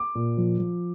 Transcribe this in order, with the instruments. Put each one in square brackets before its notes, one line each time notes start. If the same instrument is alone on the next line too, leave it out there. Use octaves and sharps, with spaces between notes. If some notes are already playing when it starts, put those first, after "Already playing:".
Already playing: [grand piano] D6
A#2
F3
F3